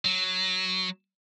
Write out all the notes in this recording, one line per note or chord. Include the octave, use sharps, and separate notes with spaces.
F#3